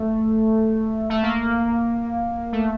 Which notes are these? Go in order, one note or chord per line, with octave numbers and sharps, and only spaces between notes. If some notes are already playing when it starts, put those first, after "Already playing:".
Already playing: A3
A3
A#3
A3